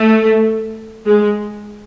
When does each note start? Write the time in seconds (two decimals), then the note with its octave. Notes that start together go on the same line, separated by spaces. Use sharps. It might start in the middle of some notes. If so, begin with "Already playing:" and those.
Already playing: A3
1.06 G#3